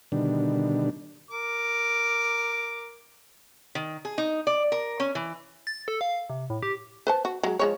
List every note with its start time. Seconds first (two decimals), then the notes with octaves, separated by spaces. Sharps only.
0.12 B2 D3 D#3 G3 D4
1.31 A#4 D6
3.75 D#3
4.05 G#4
4.18 D#4
4.47 D5
4.72 A#4
5.00 C#4
5.15 E3
5.67 A6
5.88 A4
6.01 F5
6.30 C3
6.50 A2
6.63 G4
7.07 B4 C5 A5
7.25 F#4
7.43 F#3 G#3
7.59 F3 G#3 C#5